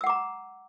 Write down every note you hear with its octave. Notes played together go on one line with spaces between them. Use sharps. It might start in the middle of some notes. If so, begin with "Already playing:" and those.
F#5 A#5 D6 E6